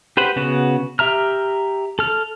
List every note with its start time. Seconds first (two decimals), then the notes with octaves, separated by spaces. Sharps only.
0.17 G4 B4 C5 F#5
0.36 C#3 B3 F#4
0.99 G4 E5 A#5 F6
1.99 A4 F6